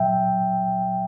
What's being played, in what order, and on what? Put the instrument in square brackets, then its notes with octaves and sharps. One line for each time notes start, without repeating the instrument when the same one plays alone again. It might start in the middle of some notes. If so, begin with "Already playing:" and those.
Already playing: [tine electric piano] A#2 F#3 E5 G5